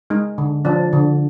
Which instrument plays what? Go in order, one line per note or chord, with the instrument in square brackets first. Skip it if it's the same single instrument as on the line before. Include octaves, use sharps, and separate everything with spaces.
[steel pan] G#3 D#4
D3
F3 D4
D3